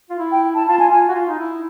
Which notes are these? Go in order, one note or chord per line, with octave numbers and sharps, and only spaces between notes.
F4
E4
G5
E4 A5
F4 A5
G#5
F4 G#5
F#4
F4
D#4
E4